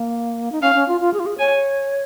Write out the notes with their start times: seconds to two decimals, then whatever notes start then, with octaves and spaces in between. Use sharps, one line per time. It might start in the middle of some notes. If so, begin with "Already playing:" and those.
Already playing: A#3
0.52 D#4
0.62 C#4 F5
0.75 C#4
0.88 F4
1.01 F4
1.14 G#4
1.20 F4
1.26 G#4
1.38 C#5 G#5